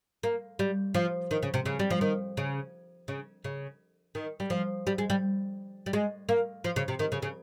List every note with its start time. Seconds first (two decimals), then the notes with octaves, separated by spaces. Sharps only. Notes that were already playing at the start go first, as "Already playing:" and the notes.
0.23 A#3
0.59 G3
0.94 F3
1.31 D#3
1.43 C#3
1.54 C3
1.66 C#3
1.79 G3
1.90 F3
2.01 D#3
2.37 C#3
3.08 C#3
3.44 C#3
4.15 D#3
4.40 G3
4.50 F3
4.87 G3
4.98 G#3
5.10 G3
5.86 G3
5.93 G#3
6.29 A#3
6.64 F3
6.76 C#3
6.88 C3
6.99 D#3
7.12 C#3
7.22 C#3